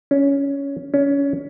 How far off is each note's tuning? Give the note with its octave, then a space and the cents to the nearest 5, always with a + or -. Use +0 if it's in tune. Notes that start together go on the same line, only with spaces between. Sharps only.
C#4 +10
C#4 +20